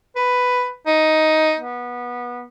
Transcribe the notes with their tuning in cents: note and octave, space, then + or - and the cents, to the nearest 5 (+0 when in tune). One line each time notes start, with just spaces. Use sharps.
B4 +5
D#4 +10
B3 -20